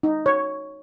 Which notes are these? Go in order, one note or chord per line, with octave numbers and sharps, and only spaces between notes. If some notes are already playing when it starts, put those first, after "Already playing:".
D#4
C#5